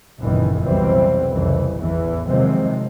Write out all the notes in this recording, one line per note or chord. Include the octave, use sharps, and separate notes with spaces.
G#1 C#2 F#2 A#2 D#3 E3
F1 B1 E3 F#3 G3 C4
C2 F2 C#3 E3
A1 E2 E3
C3 D#3 F3 F#3 G#3 C4